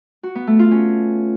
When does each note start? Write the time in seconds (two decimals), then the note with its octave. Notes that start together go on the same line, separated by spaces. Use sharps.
0.23 F#4
0.35 B3
0.47 A3
0.59 F4
0.71 C#4